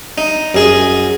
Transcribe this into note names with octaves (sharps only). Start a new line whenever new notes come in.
D#4
F#2 G#4 D#6